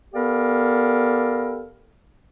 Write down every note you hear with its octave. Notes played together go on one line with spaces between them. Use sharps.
B3 G4 A4 A#4 D5 F5